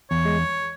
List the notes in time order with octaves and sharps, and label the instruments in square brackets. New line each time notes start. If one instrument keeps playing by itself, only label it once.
[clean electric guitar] E2 [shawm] C#5
[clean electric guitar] G#3